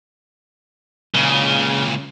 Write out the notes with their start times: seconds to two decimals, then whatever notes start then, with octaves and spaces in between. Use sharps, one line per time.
1.14 C#2 A#2 C#3